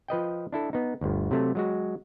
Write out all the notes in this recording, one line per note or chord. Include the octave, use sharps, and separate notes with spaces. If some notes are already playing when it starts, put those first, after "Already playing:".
F3 B4 D#5 G5
D4 E4 A4
B3 D#4
G1 D2
C3 F#3 A3
F#3 G#3 F#4